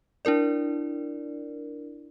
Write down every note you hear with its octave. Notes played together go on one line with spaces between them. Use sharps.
D4 E4 A#4 D5